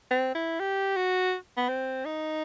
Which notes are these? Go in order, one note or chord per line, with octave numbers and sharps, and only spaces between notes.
C4
E4
G4
F#4
B3
C4
D#4